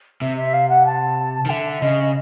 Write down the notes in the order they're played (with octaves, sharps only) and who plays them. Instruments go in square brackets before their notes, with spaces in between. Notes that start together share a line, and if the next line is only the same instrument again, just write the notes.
[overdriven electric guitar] C3 [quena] E5
[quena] E5
F5
F#5
A5
[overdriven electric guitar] D#3
[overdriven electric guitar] D3 [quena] E5
[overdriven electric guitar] C#3 [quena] D#5